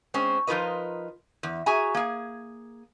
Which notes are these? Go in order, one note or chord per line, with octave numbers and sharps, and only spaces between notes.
G#3 C4 C#4
F3 D#4 F4 A#4 B4 D#5
E2
F#4 G#4 E5 G#5 A#5
A#3 G#4